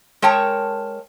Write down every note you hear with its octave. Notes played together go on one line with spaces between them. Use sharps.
G#3 A#4 C#5 G5 A5